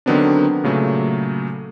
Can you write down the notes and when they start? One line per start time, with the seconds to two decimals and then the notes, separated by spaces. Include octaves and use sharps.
0.06 D3 D#3 F#3 B3 C4 D4
0.64 A#2 C#3 F#3 A3